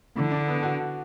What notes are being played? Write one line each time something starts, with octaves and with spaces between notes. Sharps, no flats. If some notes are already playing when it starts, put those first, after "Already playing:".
D3 E4
D4
B3
F#4